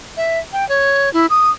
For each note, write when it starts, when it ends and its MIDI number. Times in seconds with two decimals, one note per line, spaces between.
0.17 0.39 76
0.53 0.67 79
0.69 1.12 73
1.14 1.26 64
1.30 1.50 87